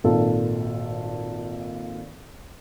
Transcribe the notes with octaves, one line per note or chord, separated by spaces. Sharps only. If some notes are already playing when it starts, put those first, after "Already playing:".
G#1 A#2 D#3 F4 A4